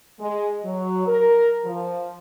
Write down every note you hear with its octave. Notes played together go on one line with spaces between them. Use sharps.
G#3
F#3
A#4
F3